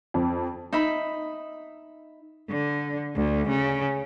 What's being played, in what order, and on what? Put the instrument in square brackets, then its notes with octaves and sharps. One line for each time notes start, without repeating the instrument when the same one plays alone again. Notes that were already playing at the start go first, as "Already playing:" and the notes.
[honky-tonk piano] F2
[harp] D#4 E5 B5
[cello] D3
D2
C#3